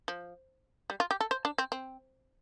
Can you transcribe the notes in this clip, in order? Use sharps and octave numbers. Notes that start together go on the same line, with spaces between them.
F3
G3
F4
G4
A4
C5
D4
C4
C4